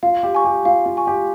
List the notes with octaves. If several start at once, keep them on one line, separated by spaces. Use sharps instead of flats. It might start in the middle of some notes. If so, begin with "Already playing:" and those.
F4 F5
G4
G#5 C#6
G4
F4 F5
F4
G#5 C#6
G4